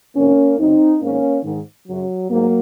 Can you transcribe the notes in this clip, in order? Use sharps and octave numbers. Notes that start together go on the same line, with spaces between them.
F2 C3 D#3 A#3 C#4
F#2 C#3 C4 D#4
G#2 D#3 A#3 C#4
G#2 D#3
F#2 C#3 F#3
G#2 F#3 A#3